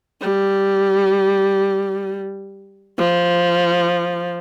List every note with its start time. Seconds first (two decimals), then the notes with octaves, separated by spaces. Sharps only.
0.22 G3
2.98 F3